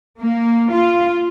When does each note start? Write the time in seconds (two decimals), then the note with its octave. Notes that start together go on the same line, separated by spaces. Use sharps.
0.21 A#3
0.71 F4